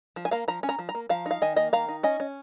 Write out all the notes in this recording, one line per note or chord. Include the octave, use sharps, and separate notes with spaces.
F3
G#5
A#3 F5 A#5
F3 A#5
C#4
A#5
F3
A#5
A#3
F3 F5 A#5
D#4 F5
D#3 D#5 G#5
A#3 D#5 G#5
D#3 F5 A#5
D#4
C#4 D#5 G#5
C#4